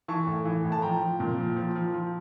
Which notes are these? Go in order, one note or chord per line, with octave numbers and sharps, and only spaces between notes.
E3 A5 C#6
A2
E3
A2
A5
F3 G5 A#5
F3
A#2
F3
F3
F3
F3